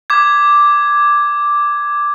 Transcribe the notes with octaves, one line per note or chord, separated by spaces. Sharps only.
D6 G#6